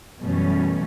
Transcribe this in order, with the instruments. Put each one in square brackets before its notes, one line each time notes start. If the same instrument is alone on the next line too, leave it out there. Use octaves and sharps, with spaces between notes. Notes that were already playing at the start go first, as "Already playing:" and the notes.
[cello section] F#2 B2 E3 G3 A3 C#4